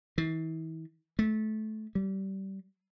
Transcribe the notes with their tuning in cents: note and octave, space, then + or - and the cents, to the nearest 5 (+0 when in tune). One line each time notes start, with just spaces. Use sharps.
E3 -40
A3 -25
G3 -25